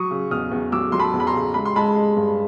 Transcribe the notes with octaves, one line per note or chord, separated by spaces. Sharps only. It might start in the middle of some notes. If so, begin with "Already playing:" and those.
Already playing: F#3 C#6 D#6
C#3
E2 D#6 F6
E2
F#3 D6 E6
F#3 C6
A5 B5
E2
B5
A#5 C6
C#3
G#3 B5
C6
G#3 A5 B5
G#3
G2